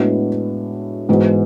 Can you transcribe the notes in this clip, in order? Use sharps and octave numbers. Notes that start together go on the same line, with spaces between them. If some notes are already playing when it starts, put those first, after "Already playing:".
Already playing: A2 G#3 B3 D4 F#4
G#2 E3 G#3 B3 F#4